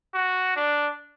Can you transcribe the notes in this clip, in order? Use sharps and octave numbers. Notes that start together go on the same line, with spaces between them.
F#4
D4